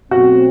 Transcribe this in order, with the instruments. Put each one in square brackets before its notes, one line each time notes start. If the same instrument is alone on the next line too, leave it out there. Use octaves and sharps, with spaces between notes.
[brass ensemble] B2 F#3 A3 C4 [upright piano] F#4